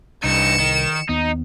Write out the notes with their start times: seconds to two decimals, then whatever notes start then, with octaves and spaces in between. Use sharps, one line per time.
0.24 C2 G2 D#4 C#7 E7
0.59 D#3
1.09 D#2 B3 D#4